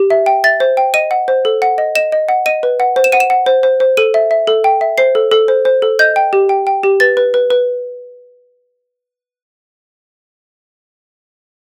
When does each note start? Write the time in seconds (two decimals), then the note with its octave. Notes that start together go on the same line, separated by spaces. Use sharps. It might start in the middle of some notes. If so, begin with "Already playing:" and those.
Already playing: G4
0.10 E5
0.26 G5
0.44 E5 A6
0.60 C5
0.77 G5
0.94 D#5 D#7
1.11 F#5
1.28 C5
1.45 A4
1.62 F#5
1.78 D#5
1.95 D#5 E7
2.12 D#5
2.29 F#5
2.46 D#5 D#7
2.63 B4
2.80 F#5
2.96 C5
3.04 E7
3.12 F#5 D#7
3.20 E7
3.30 F#5
3.46 C5
3.63 C5
3.80 C5
3.97 A4 D#7
4.14 E5
4.31 E5
4.47 A4
4.64 G5
4.81 E5
4.98 C5 C7
5.15 A4
5.31 A4
5.48 C5
5.65 C5
5.82 A4
5.99 D#5 G6
6.16 G5
6.33 G4
6.49 G5
6.67 G5
6.83 G4
7.00 B4 A6
7.17 B4
7.34 B4
7.50 B4